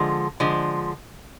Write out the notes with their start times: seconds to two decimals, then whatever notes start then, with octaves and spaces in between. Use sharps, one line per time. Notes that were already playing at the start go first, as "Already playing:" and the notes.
Already playing: D3 F3 G#3
0.40 D3 F3 G#3